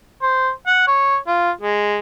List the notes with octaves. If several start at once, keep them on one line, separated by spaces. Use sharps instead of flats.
C5
F#5
C#5
F4
G#3